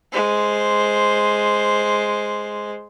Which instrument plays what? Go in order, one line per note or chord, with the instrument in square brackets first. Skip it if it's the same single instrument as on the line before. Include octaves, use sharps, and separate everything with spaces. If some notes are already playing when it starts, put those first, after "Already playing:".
[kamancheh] G#3 C5